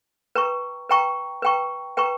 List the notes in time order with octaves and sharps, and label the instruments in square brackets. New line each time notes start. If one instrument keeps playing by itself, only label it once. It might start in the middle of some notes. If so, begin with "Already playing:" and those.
[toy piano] B4 G5 A#5 C#6
B4 G5 A#5 C#6
B4 G5 A#5 C#6
B4 G5 A#5 C#6